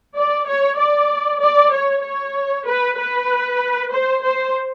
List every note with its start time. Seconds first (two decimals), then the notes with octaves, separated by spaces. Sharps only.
0.16 D5
0.47 C#5
0.78 D5
1.41 D5
1.72 C#5
2.03 C#5
2.66 B4
2.97 B4
3.92 C5
4.23 C5